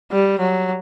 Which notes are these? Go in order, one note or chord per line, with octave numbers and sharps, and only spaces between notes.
G3
F#3